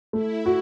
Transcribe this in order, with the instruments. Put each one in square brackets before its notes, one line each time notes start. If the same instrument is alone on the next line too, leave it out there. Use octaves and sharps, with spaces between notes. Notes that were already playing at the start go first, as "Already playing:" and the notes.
[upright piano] A3 [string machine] E4
[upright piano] F#4